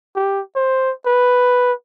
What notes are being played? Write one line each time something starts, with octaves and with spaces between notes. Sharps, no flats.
G4
C5
B4